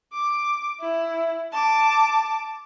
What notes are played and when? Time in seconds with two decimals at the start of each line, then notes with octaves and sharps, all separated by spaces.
0.13 D6
0.80 E4
1.52 A5 D6